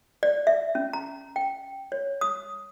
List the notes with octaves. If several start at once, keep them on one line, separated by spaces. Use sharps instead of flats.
D5
E5
C#4
A#5
G5
C#5
D#6